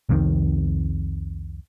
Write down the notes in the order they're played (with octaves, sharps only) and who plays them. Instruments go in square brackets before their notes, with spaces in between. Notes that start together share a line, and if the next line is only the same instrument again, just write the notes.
[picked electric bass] C2 F2 C3 D#3